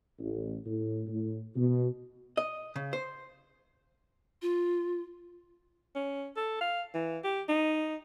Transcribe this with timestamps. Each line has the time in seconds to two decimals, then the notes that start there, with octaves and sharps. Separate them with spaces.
0.19 A1
0.66 A2
1.07 A2
1.55 B2
2.37 D#5
2.76 C#3
2.93 C5
4.42 F4
5.95 C#4
6.37 A4
6.61 F5
6.95 E3
7.24 G4
7.49 D#4